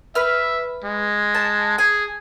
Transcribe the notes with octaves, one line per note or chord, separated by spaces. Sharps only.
B4 E5 F6
G#3
A5
G#4 G#5